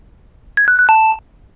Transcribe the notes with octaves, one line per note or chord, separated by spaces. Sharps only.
G#6
F#6
F#6
A5